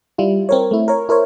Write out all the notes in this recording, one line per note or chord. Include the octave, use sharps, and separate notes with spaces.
G3 E4 F4
C4 A#4 C#5
A3 E4
A#4 C#5
E4 A#4 C5 C#5